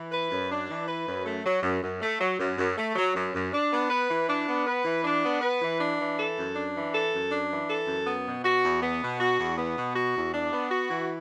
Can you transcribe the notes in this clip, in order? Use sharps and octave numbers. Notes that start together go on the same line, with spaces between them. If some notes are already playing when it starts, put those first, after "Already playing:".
Already playing: E3
B4
F#2
D4
E3
B4
F#2
A3
F#3
F#2
F#2
A3
F#3
F#2
F#2
A3
F#3
F#2
F#2
D4
B3
B4
E3
D4
B3
B4
E3
D4
B3
B4
E3
D4
E3
A4
F#2
D4
E3
A4
F#2
D4
E3
A4
F#2
B3
B2
F#4
E2
B3
B2
F#4
E2
B3
B2
F#4
E2
D4
B3
F#4
E3